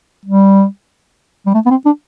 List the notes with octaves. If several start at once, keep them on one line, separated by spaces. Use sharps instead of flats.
G3
G3
A3
B3
C4
D4